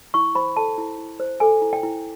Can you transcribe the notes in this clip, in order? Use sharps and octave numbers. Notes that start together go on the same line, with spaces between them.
E4 C#6
C5 B5
A4 A5
E4
E4
C5
A4 G#5
E4
G5
E4